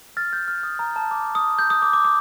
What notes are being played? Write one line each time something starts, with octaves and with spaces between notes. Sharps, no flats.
F6 A6
G6
F6
D#6
A#5
A5
D6
D#6
G6
D#6
D6
D6
D6